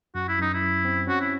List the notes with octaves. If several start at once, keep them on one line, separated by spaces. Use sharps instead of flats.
F#2 F#4
E4
F#2 D#4
E4
F#2
C4
C#4 F#4
E4